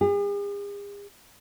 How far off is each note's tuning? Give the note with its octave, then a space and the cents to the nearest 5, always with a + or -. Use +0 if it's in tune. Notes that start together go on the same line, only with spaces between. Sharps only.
G#4 -45